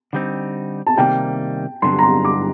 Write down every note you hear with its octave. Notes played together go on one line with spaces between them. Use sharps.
D3 G3 C4 D#4
A5
C3 D#3 G3 A#3 G5
G2 D3 F#3 C6
A#5
C6
D6